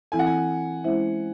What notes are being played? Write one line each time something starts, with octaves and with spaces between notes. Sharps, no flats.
E3 C4 E4 A4 G#5
F#5
G#5
G#3 C#4 E4 C5 E5